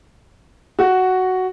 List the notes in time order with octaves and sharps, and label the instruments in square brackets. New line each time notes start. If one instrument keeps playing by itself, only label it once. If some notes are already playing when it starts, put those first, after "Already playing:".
[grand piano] F#4